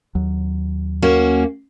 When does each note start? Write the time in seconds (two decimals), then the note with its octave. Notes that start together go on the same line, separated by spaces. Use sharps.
0.15 D#2 F#3
1.02 A#3 C#4 F#4